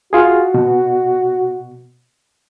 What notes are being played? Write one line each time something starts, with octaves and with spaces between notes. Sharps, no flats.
F4 F#4 G#4
B2